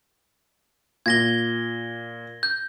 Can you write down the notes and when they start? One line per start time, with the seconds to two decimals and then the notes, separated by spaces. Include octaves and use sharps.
1.06 A#2 G#6 A#6 G7
2.43 G6